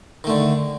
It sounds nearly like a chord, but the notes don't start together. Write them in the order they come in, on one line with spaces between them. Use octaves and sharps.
D#3 A3 D3